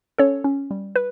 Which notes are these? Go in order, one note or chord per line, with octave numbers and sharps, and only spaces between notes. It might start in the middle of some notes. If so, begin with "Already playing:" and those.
C#4 A4 C#5
C#4
G3
B4